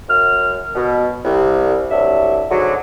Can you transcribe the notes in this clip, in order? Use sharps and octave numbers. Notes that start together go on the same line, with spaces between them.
F#2 F6
B2
C2
C2 F#3 D4 E5
G#2 D3 F#3